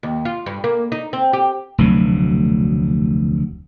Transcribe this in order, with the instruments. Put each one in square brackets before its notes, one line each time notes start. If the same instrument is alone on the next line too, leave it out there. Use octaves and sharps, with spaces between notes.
[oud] D#2
F4
G2
A#3
D#4
C4
G4
[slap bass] F1 D2 B2 F#3